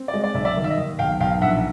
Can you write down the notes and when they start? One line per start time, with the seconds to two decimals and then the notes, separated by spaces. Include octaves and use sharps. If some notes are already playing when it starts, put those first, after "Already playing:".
Already playing: C4
0.08 D5
0.13 G#3 D#5
0.24 D5
0.34 B1 D5 E5
0.45 D5 E5
0.56 D#3
0.64 E5
0.70 D#5
0.78 D#2
0.99 B1 F5 G5
1.20 B1 F5 G5
1.42 A#1 E5 F#5